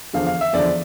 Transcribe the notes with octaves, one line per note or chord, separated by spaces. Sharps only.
E2 D3 F3 F5
F5
E5
E2 D3 F3 D5